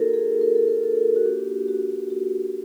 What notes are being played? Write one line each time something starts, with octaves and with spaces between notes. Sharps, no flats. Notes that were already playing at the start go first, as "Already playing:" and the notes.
Already playing: A#3 D#4 F#4 A4 A#4
G#4
A#4
A4
A#4
A4
F#4
A#3 D4 F4 G4
F#4
F#4